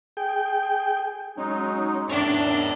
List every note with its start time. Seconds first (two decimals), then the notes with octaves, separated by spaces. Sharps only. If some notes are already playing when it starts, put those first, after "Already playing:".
0.17 G#4 G5
1.38 F#3 G#3 C#4 D#4
2.10 E2 D#3 D4 C#5 E5